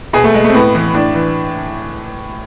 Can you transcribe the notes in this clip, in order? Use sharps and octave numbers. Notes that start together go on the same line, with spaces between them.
B2 G#4
A3
G#3
A3
C4
A2 B3
E3
A2 D4
E3